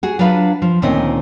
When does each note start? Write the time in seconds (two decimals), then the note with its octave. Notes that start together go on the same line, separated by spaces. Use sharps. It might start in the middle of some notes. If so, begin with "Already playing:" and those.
0.03 F#4 G#4
0.19 F#3 D4 F4 B4 F5
0.62 F3
0.82 D2 A#2 D#3 C4 C#4 D#5